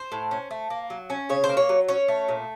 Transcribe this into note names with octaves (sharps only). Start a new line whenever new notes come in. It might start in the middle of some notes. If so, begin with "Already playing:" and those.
Already playing: C5
A2
C#4
A3
A#3
F#3
C#4
C#3 C#5
C5
A#3
C#5
F#3
C#4 C#5
A3
A#2